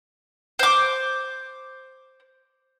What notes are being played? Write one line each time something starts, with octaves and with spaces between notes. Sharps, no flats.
C5 D6